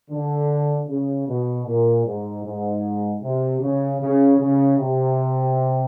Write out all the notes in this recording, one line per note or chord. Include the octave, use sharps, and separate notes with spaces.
D3
C#3
B2
A#2
G#2
G#2
C3
C#3
C#3
C#3
C3